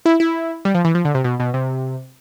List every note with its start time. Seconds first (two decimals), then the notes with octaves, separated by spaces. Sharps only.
0.06 E4
0.20 E4
0.65 G3
0.75 F3
0.85 E3
0.95 F3
1.05 D3
1.15 C3
1.24 B2
1.40 B2
1.54 C3